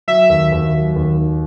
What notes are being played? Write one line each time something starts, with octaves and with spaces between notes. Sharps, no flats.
F#3 E5
D#2
D#2
F#3
D#2
D#3